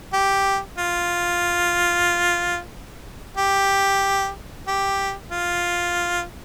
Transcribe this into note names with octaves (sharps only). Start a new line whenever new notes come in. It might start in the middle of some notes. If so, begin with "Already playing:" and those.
G4
F4
G4
G4
F4